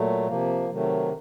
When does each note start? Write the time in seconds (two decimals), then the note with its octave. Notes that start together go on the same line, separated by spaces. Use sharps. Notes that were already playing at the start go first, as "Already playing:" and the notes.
Already playing: A#2 F#3 A3
0.27 C3 F3 A#3
0.70 C3 D#3 F#3 A3